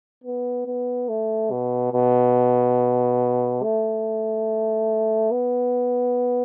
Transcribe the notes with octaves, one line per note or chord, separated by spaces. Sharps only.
B3
B3
A3
B2
B2
A3
B3